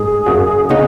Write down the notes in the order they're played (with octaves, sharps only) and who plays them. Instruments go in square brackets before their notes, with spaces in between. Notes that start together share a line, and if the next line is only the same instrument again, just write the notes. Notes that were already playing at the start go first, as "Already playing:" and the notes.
Already playing: [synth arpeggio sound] G#2 G#3 D#4 [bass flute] G#4
[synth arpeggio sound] F#2 C#3 F#3
[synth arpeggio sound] C#3 B3 D#4 [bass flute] G#4